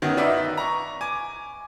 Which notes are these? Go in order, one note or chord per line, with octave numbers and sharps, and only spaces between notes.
F#2 D#3 F#3 B3
D#4 B4 D5 E5
A#5 C#6
G#5 D6